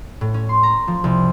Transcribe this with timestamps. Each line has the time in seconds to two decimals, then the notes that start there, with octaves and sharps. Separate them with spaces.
0.21 A2
0.34 C#4
0.49 C6
0.63 A#5
0.88 F3
1.04 C2